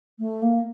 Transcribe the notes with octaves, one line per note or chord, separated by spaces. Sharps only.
A3
A#3